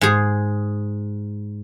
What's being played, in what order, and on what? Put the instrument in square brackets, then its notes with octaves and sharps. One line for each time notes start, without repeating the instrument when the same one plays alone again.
[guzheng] G#2 G#4